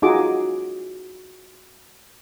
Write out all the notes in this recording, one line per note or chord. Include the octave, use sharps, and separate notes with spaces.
D#4 F4 F#4 G#4 D6